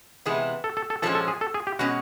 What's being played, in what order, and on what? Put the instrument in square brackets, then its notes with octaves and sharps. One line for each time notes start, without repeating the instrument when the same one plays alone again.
[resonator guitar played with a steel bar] C3 E3 G#3 B3 E4 [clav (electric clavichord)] G#4
[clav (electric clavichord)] A4
A4
A4
[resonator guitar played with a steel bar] A#2 F3 G#3 C#4 [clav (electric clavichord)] A4
[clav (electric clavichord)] A4
G#4
A4
G#4
G4
[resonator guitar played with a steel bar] B2 G#3 C#4 [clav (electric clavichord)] F#4